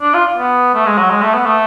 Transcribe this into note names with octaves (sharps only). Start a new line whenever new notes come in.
D4
F4
B3
A3
G#3
F#3
G#3
A3
B3
A3